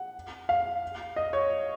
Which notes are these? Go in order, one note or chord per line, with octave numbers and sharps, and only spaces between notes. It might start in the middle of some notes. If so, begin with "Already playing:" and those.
Already playing: F#5
F5
D#5
C#5